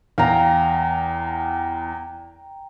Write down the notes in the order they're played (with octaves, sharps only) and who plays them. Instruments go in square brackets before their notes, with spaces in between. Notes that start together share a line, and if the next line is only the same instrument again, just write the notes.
[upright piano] E2 F5 [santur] G5 A#5